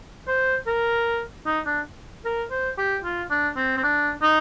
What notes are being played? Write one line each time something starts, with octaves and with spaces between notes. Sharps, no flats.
C5
A#4
D#4
D4
A#4
C5
G4
F4
D4
C4
C4
D4
D#4